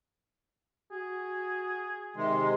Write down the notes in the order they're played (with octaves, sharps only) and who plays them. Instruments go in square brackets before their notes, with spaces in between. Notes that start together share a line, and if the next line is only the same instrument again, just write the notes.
[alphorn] F#4 [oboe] G#4
[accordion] C3 G#3 [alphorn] D#3 [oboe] C6